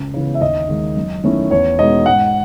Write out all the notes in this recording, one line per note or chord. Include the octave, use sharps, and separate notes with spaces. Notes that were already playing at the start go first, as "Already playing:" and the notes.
Already playing: C#2
C#3 E3 B3
E5
D#2 D#5
D#3 G#3
F#2
D#3 A3 C#4 E4
E2 C#5
B2 G#3 D#4 D#5
G#2 F#5